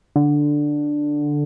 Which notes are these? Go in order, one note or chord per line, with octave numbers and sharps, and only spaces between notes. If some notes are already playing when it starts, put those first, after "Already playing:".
D3